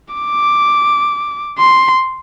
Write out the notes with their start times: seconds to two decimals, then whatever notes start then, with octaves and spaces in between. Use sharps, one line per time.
0.14 D6
1.58 C6